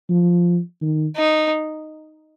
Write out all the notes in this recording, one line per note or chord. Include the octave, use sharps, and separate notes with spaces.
F3
D#3
D#4